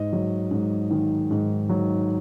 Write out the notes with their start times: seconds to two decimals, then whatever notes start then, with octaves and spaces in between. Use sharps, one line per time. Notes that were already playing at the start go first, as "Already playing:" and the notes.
Already playing: G#2 D#5
0.13 F#3
0.51 G#2
0.91 D#3
1.31 G#2
1.69 F#3